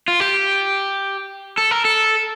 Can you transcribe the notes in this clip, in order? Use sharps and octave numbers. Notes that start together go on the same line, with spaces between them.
F4
G4
A4
A#4
A4